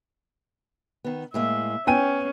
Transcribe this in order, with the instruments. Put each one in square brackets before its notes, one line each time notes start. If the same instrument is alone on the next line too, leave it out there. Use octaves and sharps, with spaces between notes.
[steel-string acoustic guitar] D#3 B3
[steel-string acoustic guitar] A2 G#3 A#3 [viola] E5
[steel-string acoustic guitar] B3 [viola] C#4 [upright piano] G5 G#5 D#7